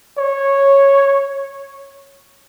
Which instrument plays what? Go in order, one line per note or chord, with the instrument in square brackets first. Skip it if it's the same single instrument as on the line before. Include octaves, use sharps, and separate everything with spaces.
[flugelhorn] C#5